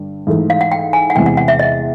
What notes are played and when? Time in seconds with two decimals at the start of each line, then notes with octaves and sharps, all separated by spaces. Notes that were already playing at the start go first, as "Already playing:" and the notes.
Already playing: G2 D3 G3
0.27 G#2 E3 A3
0.50 F5
0.61 F#5
0.72 G5
0.93 G#5
1.10 F#5
1.15 E2 C3 E3 G#3 C4 G5
1.26 F#5
1.37 F#5
1.48 E5
1.59 D#5